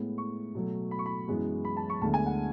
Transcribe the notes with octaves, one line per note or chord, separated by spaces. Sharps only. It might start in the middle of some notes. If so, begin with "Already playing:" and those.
Already playing: A2 G#3 B3
C#6
B2 F#3 A3
B5
C#6
B5
F#2 E3 G#3 B3
B5
A5
C#6
D2 D3 G#3 B3 A5
G#5
F#5